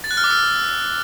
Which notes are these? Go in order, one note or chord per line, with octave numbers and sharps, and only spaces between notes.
A6
F#6
F6
D6
E6